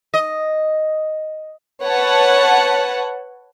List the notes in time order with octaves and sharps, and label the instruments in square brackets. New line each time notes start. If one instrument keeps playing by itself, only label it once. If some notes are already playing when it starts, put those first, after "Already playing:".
[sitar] D#5
[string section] B4 C#5 F#5 A5